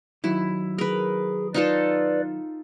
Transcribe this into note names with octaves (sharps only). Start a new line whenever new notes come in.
D#3 F#3 E4
G#4 A#4 B4
D#4 F4 A4 B4 D5